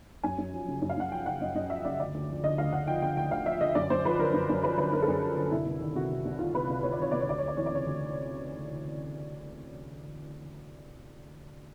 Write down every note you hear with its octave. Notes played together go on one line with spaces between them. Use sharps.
F#2 G#5
F#2
F3
C#3
F#2
F5
F#2 F#5
F3 G5
C#3 F#5
F#2 D#5
F#2 D#5
F3 E5
C#3 D5
D2 D5
D2
F3
D3 D#5
D2 F5
D2 F#5
F3 G5
D3 G5
D2 G5
D2 F5
F3 E5
D3 D#5
F#2 D5
F#2 C5
F3 B4
D3 A#4
F#2
F#2
F3 B4
D3 B4
F#2 A#4
A4
F#2 G#4
F3
D3
C2 E4
C2
D#3
C3 F#4
C2
C2
D#3 F4
C3 B4
C2
C2 C#5
D5
D#3 C#5
C3 D5
C#5
D2 D5
D2 C#5
D5
E3 C#5
D5
C#3 C#5
D2